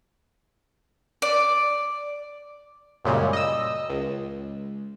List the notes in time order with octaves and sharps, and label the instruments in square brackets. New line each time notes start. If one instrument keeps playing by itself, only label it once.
[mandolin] D5
[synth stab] F#2 A#2 C#3 G3 G#3
D#5 E6
C#2